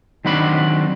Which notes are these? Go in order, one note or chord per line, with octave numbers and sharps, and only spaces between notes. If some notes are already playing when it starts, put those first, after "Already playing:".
D#3 F#3 C4 D4 B5